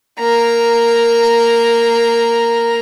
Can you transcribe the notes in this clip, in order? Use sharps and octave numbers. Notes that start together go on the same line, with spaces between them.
A#3 A#5